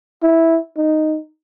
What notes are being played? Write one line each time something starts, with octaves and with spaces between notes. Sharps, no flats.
E4
D#4